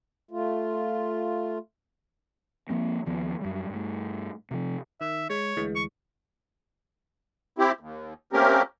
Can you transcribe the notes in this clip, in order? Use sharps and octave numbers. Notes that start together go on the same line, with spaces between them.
A3 F4
F3 A#3 C4
D#2 F3 B3
F#2 G3
G2 A3
C3 F3
D#3 E5
G#3 C#5
D2 E3 G#3
C#6
C4 E4 G4
D#2
A3 A#3 C4 C#4 G4 A#4